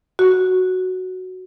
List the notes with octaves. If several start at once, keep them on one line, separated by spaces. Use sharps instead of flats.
F#4